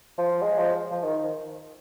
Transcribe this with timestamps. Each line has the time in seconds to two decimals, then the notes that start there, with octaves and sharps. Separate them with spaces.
0.18 F3
0.42 G#3
0.58 F3
0.92 F3
1.04 D#3